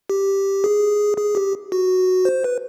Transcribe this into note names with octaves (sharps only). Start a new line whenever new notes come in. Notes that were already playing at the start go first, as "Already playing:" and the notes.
G4
G#4
G#4
G4
F#4
C5
B4